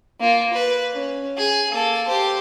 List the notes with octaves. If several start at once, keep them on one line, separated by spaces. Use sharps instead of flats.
A#3 F4
B4
C#4
G#4
A#3 A4
G4 C5